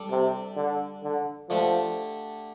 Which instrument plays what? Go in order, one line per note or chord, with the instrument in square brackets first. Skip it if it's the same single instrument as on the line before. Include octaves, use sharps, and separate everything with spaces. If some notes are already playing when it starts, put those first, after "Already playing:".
Already playing: [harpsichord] G3 D4 A4 D5
[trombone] C3
D3
D3
[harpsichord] D3 A3 D4 G4 [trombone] F3